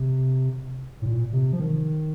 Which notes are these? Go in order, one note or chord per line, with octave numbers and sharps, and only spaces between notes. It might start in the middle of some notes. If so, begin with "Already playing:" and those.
Already playing: C3
A2
A#2
C3
F3
D#3